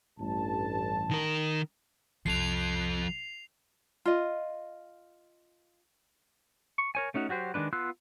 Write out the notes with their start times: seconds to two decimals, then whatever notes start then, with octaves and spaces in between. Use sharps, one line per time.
0.20 A1 G2 A5
1.11 D#3 A#4
2.26 C2 F3 A4 C7 F7
4.05 F4 D#5
6.78 C#6
6.95 A#4 C#5 G#5
7.14 A3 C#4 D#4 F#4
7.29 F#3 F#4 G4 C5
7.54 D#3 G3 G#3 D4 B4
7.73 B3 F4 C6 E6 F#6